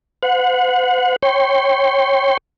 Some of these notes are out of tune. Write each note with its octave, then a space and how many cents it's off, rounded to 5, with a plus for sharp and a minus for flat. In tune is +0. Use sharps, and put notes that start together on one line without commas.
C5 -45 F#5 -30
C#5 -20 G5 +0 C6 -25